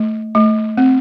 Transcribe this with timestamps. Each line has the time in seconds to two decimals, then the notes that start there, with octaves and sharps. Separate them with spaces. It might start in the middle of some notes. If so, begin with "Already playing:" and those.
Already playing: A3
0.35 A3
0.77 C4